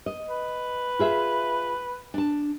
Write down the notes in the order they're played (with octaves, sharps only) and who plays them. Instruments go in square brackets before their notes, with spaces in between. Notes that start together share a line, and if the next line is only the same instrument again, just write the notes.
[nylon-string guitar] D#5
[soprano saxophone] B4
[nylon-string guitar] F4 G#4 E5
D4 A5